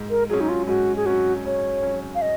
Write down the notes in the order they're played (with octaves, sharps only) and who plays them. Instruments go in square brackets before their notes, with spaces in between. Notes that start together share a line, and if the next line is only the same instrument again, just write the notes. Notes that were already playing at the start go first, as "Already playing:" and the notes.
Already playing: [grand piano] G#2
[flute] A#4
[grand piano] F#3 C#4 [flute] G#4
[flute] D#4
F4
[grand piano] G#2 [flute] F#4
[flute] G#4
[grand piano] F#3 C#4 [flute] F#4
[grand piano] G#2 [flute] C#5
[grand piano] F#3 C#4
[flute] F5
D#5